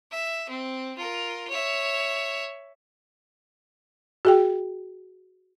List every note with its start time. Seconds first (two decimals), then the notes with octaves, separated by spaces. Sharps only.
0.11 E5
0.49 C4
0.98 F4 A#4
1.49 C#5 E5
4.25 F#4 G#4 G5